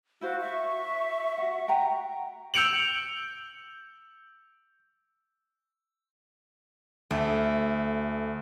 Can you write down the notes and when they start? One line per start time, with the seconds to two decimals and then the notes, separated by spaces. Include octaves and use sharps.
0.21 E4 F#4 C5 F5
0.41 E5 C#6
1.38 F#4 F#5
1.68 F#5 G5 A#5
2.54 E6 G6 C#7 D7 F7 F#7
7.11 D2 A3